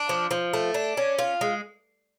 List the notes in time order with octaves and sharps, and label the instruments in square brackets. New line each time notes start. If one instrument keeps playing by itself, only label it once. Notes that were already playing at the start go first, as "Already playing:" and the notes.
Already playing: [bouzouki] D4
F3
F3
A3
D4
C#4
F4
G#3